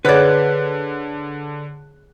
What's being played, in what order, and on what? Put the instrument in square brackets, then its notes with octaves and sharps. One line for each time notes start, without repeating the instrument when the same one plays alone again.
[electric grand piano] D3 F#6 [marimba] G#4 C#5 F#5 [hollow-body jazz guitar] B4 D5